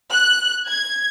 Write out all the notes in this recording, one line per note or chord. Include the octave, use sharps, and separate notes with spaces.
F#6
G#6